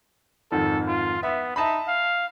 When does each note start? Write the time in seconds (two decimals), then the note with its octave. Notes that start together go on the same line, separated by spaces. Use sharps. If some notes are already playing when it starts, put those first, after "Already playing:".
0.52 F2 G#2 D#3 A4
0.87 F4
1.23 B3 E5
1.56 D#4 E5 A5 B5
1.88 F5